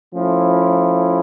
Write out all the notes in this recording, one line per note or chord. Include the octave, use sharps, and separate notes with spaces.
F3 A3 C#4 E4